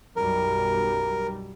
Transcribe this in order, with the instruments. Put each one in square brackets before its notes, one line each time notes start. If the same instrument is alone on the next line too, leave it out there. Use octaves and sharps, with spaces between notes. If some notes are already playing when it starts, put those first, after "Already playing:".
[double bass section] B1 F#2 G3 [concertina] A#4